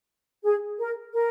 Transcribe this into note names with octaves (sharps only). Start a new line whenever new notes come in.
G#4
A#4
A#4